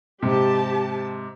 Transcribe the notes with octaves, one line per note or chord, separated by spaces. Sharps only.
G#2 C3 G4 A5